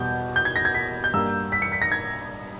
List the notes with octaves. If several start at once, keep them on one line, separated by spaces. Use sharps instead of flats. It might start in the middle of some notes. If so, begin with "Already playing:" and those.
Already playing: E2 B2 G3 B3 G6
G6
G#6
A#6
G#6
B6
G6
G2 G3 A#3 E6
B6
C#7
B6
A#6
G#6